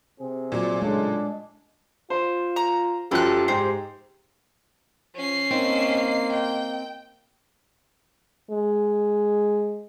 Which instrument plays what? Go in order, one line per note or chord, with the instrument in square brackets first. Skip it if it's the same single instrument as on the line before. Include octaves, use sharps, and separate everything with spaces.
[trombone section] C3 C4 G#4
[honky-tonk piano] A#2 F#3 [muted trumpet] D5
[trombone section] A2 C#3 [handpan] G#3 [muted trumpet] D4
[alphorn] F4 [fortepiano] C5
[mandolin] A#5
[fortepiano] F#2 F3 [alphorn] G4 [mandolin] A4 F#6
[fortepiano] G#2 [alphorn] G4 [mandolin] C5
[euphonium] F3 [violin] C#4 C7
[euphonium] A#3 [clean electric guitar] C4 [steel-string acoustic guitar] D#4
[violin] G5
[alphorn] G#3